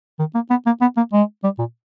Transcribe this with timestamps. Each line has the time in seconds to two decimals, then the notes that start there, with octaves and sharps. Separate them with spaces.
0.19 D#3
0.35 A#3
0.50 B3
0.66 A#3
0.81 B3
0.97 A#3
1.13 G#3
1.44 G3
1.59 A#2